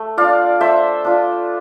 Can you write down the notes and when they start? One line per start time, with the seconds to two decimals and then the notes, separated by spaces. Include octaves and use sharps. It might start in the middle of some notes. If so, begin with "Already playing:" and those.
Already playing: A3
0.17 D4 F4 D5 F5
0.60 A3 C5 E5
1.04 D4 F4